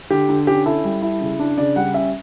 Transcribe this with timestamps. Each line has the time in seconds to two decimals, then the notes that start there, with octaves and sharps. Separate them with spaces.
0.10 D3 G4
0.29 D3
0.47 C#4 G4
0.66 E4 A4
0.84 G3
1.02 E4
1.21 C#3
1.40 D4
1.58 C#3 D5
1.76 G3 F#5
1.94 C#4 E5